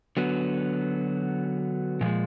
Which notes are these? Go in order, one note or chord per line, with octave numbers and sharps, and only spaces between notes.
D3 F#3 B3
A#2 F3 G#3